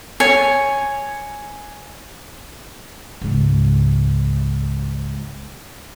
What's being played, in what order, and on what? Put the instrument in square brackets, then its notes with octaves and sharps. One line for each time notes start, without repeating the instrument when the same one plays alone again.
[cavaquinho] C#5 G#5
[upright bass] C#2 G#2